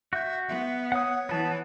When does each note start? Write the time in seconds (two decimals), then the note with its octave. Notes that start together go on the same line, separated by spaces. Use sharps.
0.13 F#4 E5 G6
0.48 B3 E5
0.92 C#5 F#5 D#6
1.29 E3 B3 A5